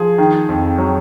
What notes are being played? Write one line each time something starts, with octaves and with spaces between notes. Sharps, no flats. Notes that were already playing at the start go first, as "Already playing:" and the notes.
Already playing: F3 G#4
D#3
F2
F#3